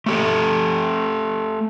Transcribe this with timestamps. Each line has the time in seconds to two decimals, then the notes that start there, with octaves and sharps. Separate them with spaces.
0.06 A3 G4 A4